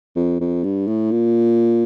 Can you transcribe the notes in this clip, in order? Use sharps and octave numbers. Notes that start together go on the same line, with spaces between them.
F2
F2
G2
A2
A#2